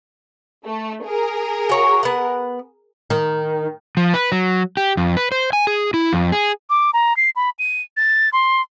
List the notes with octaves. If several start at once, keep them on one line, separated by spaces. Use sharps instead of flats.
A3
G#4 A#4
F#4 C#5
B3 F#5
D#3
F3
B4
F#3
G4
F2
B4
C5
G#5
G#4
E4
F2
G#4
D6
A#5
C7
B5
D#7
A6
C6